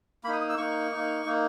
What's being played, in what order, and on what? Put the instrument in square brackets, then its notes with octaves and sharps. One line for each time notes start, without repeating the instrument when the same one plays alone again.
[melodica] A#3 B5
D#4 D#6
D#6
E6
A#3 D#4 C#6
D#4
A#3
A#3 D#4